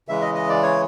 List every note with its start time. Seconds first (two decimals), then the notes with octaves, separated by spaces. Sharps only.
0.08 C#3 E3 G#3 E5
0.22 D#5
0.35 D#5
0.49 D5
0.62 C#5